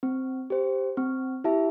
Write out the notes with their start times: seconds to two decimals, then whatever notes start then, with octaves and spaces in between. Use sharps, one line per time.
0.03 C4
0.50 G4 C5
0.97 C4
1.44 E4 G4 E5 A5